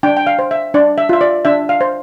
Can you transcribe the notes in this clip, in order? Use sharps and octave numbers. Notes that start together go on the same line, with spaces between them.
D4 G5
G5
F5
C5
E5
D4 D5
E5
F4 E5
D5
D4 E5
F5
C5